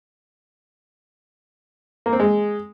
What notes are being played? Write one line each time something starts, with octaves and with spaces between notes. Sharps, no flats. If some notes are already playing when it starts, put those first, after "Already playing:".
A#3
C4
G#3